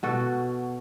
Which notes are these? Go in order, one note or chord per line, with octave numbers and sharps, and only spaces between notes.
B2 F#4 A4